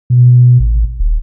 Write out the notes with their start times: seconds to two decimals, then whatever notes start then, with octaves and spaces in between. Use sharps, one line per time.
0.10 B2
0.60 A1
1.00 D#1